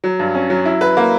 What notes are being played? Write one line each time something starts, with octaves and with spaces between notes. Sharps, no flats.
F#3
G2
C#4
F#3
E4
B4
A#3